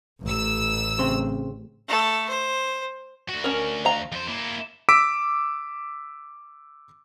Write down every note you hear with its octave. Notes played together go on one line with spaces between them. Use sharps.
A1 E6
C#3 C4 C5
A3 A4
C5
D2 F#4
C#4 A#4
F5 A#5
F2 C5
A#3 E4
D6 E6 B6 D7